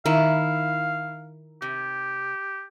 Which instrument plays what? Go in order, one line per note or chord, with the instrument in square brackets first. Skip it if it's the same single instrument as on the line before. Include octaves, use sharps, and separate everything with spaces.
[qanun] D#3 [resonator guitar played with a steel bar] E4 [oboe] F5
[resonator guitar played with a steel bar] C3 [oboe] G4